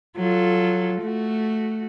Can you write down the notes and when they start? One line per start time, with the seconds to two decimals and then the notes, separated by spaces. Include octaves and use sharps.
0.16 F#3 F4 A4
1.02 A3 F#4